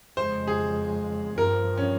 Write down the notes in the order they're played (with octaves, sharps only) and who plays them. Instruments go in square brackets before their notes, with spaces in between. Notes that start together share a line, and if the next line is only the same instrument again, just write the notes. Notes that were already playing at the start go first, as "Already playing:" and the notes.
[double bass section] F2 C#3 G#3 [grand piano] C5
[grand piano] G#4
[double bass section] G2 F3 C4 [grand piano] A#4
[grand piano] C#4